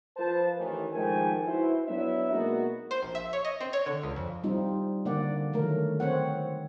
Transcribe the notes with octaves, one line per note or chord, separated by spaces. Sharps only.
F3 B4 C5 A5
A1 D#3 E3
G#2 D#3 F3 A3 G5 G#5
E4 F#4 B4 C5
F#3 B3 D4 E4 D5 E5
B2 G#3 A#3 B3 D#4 F#4
C5
A#1
E5
C#5
D#5
C4
C#5
D3
C#2
F2
G3 C4 D#4 F4
D3 A#3 D5 F#5
D#3 F#3 A3 A#4
C4 C#5 F#5